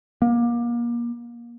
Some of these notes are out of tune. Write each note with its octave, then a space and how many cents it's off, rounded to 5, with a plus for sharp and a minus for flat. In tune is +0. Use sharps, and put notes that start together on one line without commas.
A#3 +30